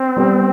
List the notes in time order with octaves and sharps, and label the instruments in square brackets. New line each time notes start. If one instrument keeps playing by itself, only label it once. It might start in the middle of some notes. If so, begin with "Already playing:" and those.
Already playing: [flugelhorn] C4
[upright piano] G3 B3